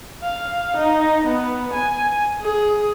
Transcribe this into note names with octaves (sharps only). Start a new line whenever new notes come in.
F5
D#4
B3
G#5
G#4